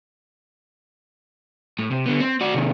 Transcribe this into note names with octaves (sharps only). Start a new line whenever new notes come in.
A2
C3
D3 B3
C4
F#4 D5
C3 D#3